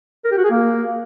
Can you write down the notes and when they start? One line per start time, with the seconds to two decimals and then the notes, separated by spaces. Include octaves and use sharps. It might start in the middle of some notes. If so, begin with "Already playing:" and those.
0.25 A#4
0.31 G4
0.38 F#4
0.44 G#4
0.50 A#3